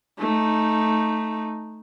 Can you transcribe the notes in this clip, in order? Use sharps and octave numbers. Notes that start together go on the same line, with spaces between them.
A3 D#4